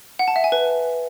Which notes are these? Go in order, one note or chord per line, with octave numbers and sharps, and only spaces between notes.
F#5
A5
E5
G#5
B4